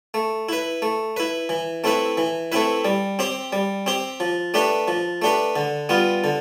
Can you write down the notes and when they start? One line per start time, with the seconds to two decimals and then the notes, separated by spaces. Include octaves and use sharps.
0.14 A3
0.49 E4 B4
0.82 A3
1.17 E4 B4
1.49 E3
1.84 A3 C4 E4 B4
2.17 E3
2.52 A3 C4 E4 B4
2.85 G3
3.19 C4 G4 C5
3.53 G3
3.86 C4 G4 C5
4.20 F3
4.54 A3 D4 G4 B4
4.88 F3
5.22 A3 D4 G4 B4
5.56 D3
5.89 G3 B3 F4
6.24 D3